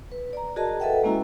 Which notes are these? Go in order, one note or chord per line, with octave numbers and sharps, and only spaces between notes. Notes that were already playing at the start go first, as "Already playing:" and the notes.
B4
D5 A#5
F#4 G#4 A#4 D#5 A5
A4 B4 D#5 E5 F#5 G5
G#3 A#3 C#4 E4 F#4 A#5